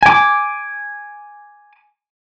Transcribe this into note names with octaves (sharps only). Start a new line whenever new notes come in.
G#5 D6